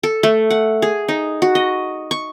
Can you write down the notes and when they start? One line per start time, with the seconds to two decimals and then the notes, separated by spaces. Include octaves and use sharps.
0.03 A4
0.23 A3
0.50 F#5
0.82 G#4
1.08 D#4
1.42 F#4
1.55 D#5
2.11 C#6